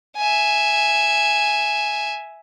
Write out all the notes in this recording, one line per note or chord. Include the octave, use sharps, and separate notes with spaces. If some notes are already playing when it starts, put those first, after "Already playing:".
E5 G#5